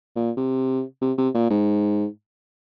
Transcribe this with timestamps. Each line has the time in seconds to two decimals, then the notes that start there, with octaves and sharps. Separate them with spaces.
0.16 A#2
0.37 C3
1.02 C3
1.18 C3
1.34 A#2
1.50 G#2